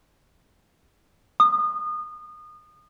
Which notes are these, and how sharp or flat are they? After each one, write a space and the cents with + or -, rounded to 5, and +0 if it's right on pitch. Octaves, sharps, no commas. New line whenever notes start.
D#6 -30